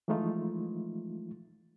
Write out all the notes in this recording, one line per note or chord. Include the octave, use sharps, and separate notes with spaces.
E3 F3 G#3 A3 D#4 F4